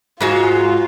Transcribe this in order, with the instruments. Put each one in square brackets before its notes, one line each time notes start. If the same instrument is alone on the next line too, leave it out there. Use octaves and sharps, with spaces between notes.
[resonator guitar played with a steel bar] G#2 G#3 F#4 [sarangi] F4